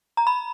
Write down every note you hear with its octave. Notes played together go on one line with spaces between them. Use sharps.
A#5
B5